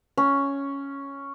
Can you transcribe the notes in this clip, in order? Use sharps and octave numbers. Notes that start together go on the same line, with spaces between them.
C#4